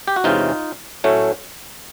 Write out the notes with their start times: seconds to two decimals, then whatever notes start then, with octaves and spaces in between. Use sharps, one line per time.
0.08 G4
0.16 F#4
0.24 E2 C3 E3 G#3 C#4 D#4 F4
1.04 A2 F#3 A3 C#4